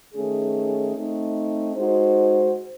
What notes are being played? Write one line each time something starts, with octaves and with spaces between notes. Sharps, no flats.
D#3 A3 C#4 G#4
A3 C4 D#4
G#3 D#4 F#4 C5